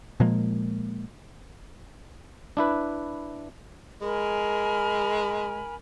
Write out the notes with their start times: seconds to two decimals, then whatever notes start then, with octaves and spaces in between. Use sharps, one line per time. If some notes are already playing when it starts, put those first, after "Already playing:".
0.20 A#2 F3 G#3 A#3
2.57 D4 E4 B4
4.02 G#3 A#4 G#5 B5